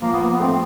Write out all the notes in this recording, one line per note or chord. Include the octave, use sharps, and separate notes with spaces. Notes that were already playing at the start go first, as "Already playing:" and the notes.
F3 A#3
B3
A#3
B3
A3 C4